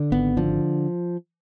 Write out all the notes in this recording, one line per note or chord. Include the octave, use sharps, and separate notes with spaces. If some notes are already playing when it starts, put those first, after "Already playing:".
Already playing: D3
G#1 B3
D3 F3